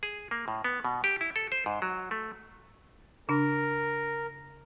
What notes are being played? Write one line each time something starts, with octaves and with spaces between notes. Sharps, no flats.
G#4
A#3
A2
B3
B2
G4
E4
A4
C5
G#2
F#3
A3
C#3 D4 A#4